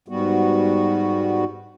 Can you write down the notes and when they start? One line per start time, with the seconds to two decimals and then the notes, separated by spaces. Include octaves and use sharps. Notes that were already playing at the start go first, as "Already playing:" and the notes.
0.08 G#2 G3 B3 F#4